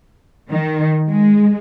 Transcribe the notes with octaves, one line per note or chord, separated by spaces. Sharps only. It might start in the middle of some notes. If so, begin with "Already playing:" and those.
D#3
G#3